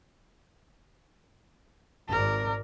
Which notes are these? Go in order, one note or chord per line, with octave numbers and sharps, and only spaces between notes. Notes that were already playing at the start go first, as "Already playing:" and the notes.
G#1 A#4 D5